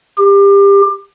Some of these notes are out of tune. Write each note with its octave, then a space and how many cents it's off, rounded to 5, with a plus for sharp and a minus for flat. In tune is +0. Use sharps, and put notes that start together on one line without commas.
G4 +25